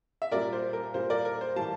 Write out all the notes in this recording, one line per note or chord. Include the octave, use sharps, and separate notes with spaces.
E5
A#2 G3 A#3 A#4 D5
C5
A#4
A#2 G3 A#3 C5
A#4 D5
A#4
C5
A2 E3 G3 F5 A5